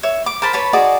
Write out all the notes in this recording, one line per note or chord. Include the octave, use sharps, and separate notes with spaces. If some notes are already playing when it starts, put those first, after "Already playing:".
C#5 E5
D6
A#4 C5 A5 B5
B4 C#5 A5 B5
D#4 F#4 G#4 D5